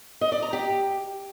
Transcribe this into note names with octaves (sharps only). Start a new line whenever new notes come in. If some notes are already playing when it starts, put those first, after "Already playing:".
D#5
D5
A#5
G4